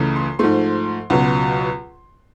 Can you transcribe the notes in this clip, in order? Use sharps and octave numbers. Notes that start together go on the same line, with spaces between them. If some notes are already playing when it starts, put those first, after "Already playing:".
Already playing: C#2 C#3 E3 A3
C6
G#2 F3 A3 C6
C#2 B2 F#3